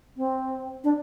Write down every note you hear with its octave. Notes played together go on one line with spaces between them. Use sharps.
C4
D4